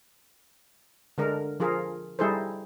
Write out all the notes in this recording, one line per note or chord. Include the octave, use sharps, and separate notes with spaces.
D3 G#3 D4 A#4
F3 F4 G#4 A#4
G3 D#4 E4 G#4 A4 C5